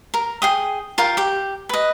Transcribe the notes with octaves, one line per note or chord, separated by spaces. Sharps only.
A#4
G#4 G5 D#6
F4 A#4 F5 G5
G4 G5
B4 D#5